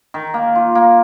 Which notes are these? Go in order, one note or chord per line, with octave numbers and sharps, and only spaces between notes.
D#3
A#3
F4
A#3